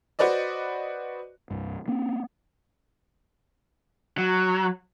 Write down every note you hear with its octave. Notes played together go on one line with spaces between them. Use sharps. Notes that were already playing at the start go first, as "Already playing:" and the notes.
F#4 B4 C5 D5 D#5
C2 G2
A#3 C4 C#4
F#3